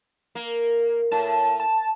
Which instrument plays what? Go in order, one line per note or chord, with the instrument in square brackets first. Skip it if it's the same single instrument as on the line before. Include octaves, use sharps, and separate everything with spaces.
[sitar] A#3
[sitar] A2 [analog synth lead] A5
[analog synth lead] A5